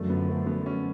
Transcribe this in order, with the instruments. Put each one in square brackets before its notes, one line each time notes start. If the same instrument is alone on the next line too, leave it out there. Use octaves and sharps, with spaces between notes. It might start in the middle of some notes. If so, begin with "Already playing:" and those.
Already playing: [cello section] F#2 D3 F3 [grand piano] A3
[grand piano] B3
A3
B3
C#4